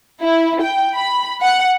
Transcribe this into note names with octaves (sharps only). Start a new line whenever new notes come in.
E4
G5
B5
F#5